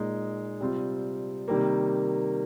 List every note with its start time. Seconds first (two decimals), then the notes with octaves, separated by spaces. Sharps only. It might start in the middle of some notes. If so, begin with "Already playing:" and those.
Already playing: A#2 G#3 D#4
0.60 C3 G3 C4 F4
1.48 C3 D#3 G3 A#3